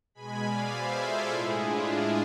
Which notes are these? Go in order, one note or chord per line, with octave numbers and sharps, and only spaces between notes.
B2 G#3 G#5 B5
D5 F5
C5 E5
F4 A4
A2 G#3 E4 G#4
D4 F4
E4